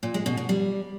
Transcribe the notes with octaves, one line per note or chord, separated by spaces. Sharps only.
A#2
G#3
B2
B2
G3